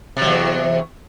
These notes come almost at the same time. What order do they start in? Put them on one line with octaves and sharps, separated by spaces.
C3 F#3 E2